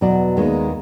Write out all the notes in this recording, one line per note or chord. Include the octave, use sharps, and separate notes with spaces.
E2 B2 F#3 D5
D#2 D#3 G#3 B3